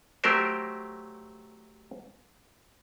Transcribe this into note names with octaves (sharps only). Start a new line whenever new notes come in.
F#3 A3 C4 G4 A#4 C5